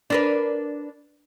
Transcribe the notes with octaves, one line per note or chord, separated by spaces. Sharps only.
D4 A#4 B4